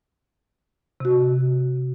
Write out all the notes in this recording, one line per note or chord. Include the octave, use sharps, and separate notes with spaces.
C3 F#4